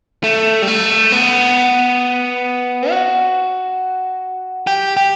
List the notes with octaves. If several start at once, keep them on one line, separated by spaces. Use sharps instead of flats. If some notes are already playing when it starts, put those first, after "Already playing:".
A3
G3
A3
B3
F#4
G4
G4